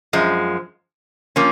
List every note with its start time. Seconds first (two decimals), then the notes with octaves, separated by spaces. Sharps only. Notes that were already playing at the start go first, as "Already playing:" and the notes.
0.13 F#2 F3 G#3
1.36 F3 A#3 C#4